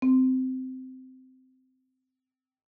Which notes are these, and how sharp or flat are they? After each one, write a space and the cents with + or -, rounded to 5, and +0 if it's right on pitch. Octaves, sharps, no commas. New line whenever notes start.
C4 -15